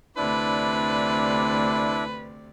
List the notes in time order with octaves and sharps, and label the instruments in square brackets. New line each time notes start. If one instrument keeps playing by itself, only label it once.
[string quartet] D2 C3 D5 [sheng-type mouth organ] D4 E4 [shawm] B4